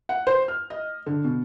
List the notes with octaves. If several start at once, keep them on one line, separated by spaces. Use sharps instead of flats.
F#5
C5
F6
D#5
D3
B2